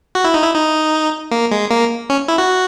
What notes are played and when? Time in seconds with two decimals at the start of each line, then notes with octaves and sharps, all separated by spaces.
0.15 F#4
0.24 E4
0.34 D#4
0.43 E4
0.54 D#4
1.31 A#3
1.51 G#3
1.70 A#3
2.10 C#4
2.28 E4
2.38 F#4